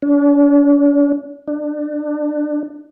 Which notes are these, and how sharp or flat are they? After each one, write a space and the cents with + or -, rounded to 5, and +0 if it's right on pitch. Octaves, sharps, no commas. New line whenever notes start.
D4 -45
D4 +25